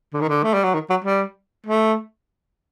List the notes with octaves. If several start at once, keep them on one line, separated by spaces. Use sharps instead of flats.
D3
D#3
D3
A3
G3
F#3
D#3
F#3
G3
A3